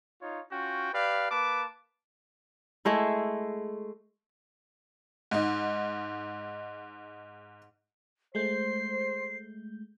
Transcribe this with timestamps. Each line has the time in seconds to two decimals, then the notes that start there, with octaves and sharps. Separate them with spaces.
0.22 D#4 F4 C#5
0.51 C#4 F4 F#4 G5
0.93 G4 B4 D5 F5
1.31 A#3 B4 A5 D6
2.85 G#3 A3 E4
5.31 G#2 D#4
8.35 G#3 A3 C5 G6 C7